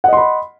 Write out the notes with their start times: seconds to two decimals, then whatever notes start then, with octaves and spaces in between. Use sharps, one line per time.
0.04 F#5
0.08 D#5
0.13 C6
0.17 B5